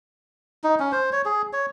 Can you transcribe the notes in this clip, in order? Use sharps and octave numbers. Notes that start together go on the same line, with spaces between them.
D#4
C#4
C5
C#5
G#4
C#5